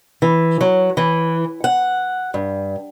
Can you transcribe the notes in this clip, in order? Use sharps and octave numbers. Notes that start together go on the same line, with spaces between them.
E3
F#3
E3
F#5
G2